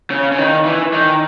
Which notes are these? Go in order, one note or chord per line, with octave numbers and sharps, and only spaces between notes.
C#3
C#3
D#3
E3
D#3